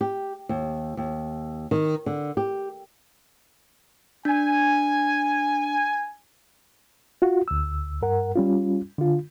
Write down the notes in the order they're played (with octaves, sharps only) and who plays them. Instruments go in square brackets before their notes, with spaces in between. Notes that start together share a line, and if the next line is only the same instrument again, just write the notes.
[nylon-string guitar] G4
D#2
D#2
D#3
D3
G4
[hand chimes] D4 [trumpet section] G#5
[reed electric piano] F4 F#4
D2 E6
G2 A#4 F#5
G3 C#4 F4
D3 F4